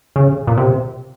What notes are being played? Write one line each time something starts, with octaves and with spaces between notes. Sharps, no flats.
C#3
A#2
C3